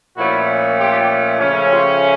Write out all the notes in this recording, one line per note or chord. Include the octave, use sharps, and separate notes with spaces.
A#2 F3 A3 C#4 E4 F#4
F4 G4
C#3 F3 A3 C#4
F4 G4